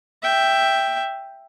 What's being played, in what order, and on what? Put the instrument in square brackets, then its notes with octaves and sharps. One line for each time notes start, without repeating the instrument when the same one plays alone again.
[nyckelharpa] E5 G5